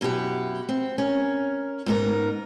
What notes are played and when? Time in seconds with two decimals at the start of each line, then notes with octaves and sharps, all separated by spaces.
0.01 F#2 B2 E4 G4 F#5
0.69 C4
0.98 C#4 A#4
1.86 G#2 B3 D#4 F4 A#4